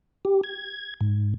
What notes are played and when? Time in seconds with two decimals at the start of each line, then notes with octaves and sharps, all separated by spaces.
0.25 G4
0.44 G#6
1.01 G#2